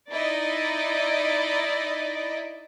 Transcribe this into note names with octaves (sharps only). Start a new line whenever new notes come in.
D#4 E4 D5 D#5